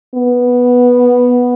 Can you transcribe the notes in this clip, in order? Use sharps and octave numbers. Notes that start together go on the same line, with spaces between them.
B3